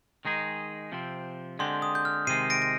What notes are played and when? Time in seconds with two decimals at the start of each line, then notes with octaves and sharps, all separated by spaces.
0.25 D#3 G#3 D#4 G#4
0.92 C3 F3 C4
1.59 D3 G#3 C4 G4 C6
1.82 D#6
1.95 G6
2.05 F6
2.27 C3 D#3 G#3 C7 D#7
2.50 A#6 D7
2.62 A#6